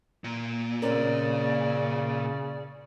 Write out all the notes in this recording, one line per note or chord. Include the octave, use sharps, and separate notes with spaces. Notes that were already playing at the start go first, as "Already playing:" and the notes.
A#2
C#3 C4 C#4 A#4 D5